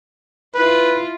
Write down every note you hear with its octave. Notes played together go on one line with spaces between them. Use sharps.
E4 F4 B4